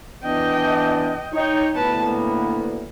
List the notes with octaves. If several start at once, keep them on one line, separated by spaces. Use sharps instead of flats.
E3 B3 D4 D#5 G5
D#4 C#5 G5
D2 A2 B3 B4 A5
A#3